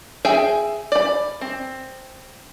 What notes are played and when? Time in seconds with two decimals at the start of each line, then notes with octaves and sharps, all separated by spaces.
0.25 G#4 E5 G5 G#5
0.92 D5 B5
1.41 C4